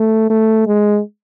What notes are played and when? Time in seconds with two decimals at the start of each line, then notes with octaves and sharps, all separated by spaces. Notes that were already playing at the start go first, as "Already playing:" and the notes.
Already playing: A3
0.30 A3
0.67 G#3